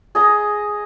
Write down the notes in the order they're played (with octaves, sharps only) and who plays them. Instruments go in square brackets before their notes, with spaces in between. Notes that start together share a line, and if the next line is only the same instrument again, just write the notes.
[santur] G#4 D#5 A#5